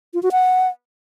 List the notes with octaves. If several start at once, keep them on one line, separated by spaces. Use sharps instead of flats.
F4
F#4
F#5